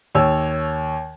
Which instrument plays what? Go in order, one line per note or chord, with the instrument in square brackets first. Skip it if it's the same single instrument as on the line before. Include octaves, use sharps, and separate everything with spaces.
[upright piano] D#2 C#5 E6